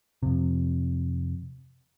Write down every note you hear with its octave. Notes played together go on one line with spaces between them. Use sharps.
F2 C3